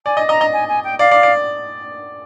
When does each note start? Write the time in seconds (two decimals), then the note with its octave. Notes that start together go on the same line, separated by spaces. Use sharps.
0.05 D5 G#5
0.17 D#5
0.28 D#5 A#5
0.41 D#5
0.52 G#5
0.68 G#5
0.83 G5
0.99 D5 F5
1.11 D5
1.23 D5